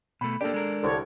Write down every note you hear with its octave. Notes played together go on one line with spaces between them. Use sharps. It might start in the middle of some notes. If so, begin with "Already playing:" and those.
B2 A3 B5
A#3 D4 G4 A4
G#3 A#4
C2 D3 C#5